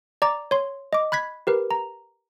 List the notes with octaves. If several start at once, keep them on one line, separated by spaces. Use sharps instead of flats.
D5 A#5 D6 A6
C#5 C6
D#5 D6
B5 F#6 G#6 B6
G4 A#4 B4
A#5